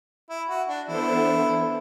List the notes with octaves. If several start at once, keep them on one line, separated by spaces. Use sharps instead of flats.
E4
F#4
D4
E3 B3 D4 E4 A4 C5